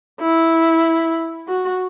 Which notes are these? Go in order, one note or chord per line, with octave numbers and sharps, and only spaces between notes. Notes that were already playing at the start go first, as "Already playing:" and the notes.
E4
F#4